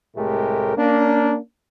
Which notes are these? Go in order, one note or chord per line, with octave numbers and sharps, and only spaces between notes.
C2 A2 G#3 A3 G4 A#4
A#3 C#4 D4